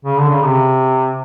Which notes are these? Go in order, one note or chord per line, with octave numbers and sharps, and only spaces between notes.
C#3
D3
C#3
C3